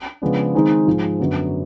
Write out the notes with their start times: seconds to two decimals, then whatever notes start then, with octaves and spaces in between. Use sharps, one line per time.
0.22 C#3 F3 G#3 B3 D4
0.54 D#3 G#3 C4 D#4
0.87 G#2 F3 G#3
1.20 F#2 D3 F#3 B3